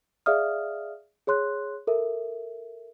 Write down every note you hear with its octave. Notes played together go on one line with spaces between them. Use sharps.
G#4 D5 E5 F5 D#6 F6
G#4 C#5 C6 F#6
A4 A#4 E5